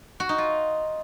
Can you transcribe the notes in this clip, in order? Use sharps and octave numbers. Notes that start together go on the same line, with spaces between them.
F#4
D#4
F4